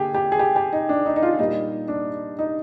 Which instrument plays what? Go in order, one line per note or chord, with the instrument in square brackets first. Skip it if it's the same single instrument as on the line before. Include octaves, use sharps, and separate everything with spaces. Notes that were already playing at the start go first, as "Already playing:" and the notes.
Already playing: [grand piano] D3 A#3 G4 G#4
G4
G#4
G4
G4
D#4
D4
D#4
D#4
F4
A#2 G3 A#3 D#4
D4
D#4